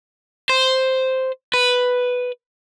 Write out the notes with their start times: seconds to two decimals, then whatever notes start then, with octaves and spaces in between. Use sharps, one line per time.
0.49 C5
1.54 B4